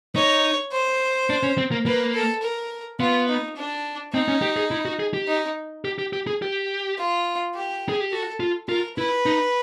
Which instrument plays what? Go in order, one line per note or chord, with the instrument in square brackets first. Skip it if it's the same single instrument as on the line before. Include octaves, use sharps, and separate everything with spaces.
[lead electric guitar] D#4 [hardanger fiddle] C#5
[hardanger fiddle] C5
[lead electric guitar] D4
C#4
C4
A#3
[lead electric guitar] A#3 [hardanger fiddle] B4
[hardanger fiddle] A4
A#4
[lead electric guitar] B3 [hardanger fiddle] F4
[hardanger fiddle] D#4
D4
[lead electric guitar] C4 [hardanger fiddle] D#4
[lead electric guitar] C#4
G4
G#4
E4
F#4
G#4
G4
[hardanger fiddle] D#4
[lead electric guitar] G4
G4
G4
G#4
G4
[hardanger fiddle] F4
G4
[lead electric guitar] G#4
G4
[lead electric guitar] F#4 [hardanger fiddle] A4
[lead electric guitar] F4
[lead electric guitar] F4 [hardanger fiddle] A#4
[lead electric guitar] E4 [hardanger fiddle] B4
[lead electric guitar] D#4